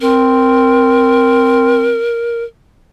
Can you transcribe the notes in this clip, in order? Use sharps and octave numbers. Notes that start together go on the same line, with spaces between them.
C4 A#4